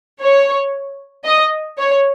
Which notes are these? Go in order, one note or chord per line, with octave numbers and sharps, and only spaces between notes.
C#5
D#5
C#5